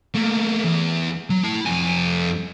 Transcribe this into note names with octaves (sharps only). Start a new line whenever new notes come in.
A3 A#3
E2 E3
F#3
E4 A5
F2 G#5